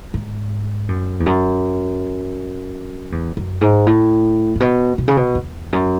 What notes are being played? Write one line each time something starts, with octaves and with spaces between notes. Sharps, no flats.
G#2
F#2
E2
F#2
E2
F#2
G#2
A2
A2
B2
B2
C#3
B2
E2
F#2